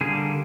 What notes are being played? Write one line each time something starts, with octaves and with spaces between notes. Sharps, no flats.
D3 G3 A#3 G#4